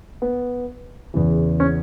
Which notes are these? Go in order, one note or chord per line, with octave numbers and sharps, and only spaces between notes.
B3
E2 C#3 E3
C#4